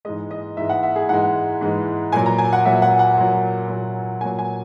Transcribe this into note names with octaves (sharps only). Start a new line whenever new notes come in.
G#2 E3 G#3 D#5
D#5
G#2 E3 G#3 E5
F#5
E5
G#4
G#2 E3 G#3 F#5
G#2 E3 G#3
A#2 F#3 G#5
A#5
G#5
F#5
A#2 F#3 E5
F#5
F#5
A#2 F#3
A#2 F#3
A#2 F#3 G#5
G#5